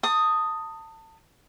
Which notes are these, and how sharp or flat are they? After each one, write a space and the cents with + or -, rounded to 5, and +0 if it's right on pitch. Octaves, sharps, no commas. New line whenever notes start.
A5 +30 D#6 +0